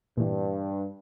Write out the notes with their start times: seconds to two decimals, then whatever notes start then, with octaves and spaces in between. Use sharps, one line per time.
0.17 G2 A#2 E3